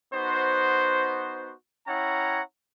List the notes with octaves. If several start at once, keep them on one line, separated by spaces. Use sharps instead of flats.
B3 D#4 F#4 C5
C#4 E4 C#5 F#5 G5 A#5